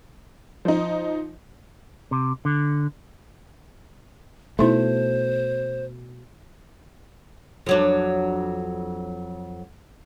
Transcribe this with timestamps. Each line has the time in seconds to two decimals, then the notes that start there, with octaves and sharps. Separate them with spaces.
0.65 F3 D#4
2.11 C3
2.45 D3
4.59 B2 A3 D#4 E4 C5
7.66 F2 F#3 D4